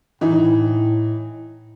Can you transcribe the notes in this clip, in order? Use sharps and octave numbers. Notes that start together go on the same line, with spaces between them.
A2 E3 D#4